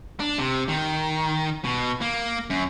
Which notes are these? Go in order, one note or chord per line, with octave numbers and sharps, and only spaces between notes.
D4
C3
D#3
B2
A#3
F#2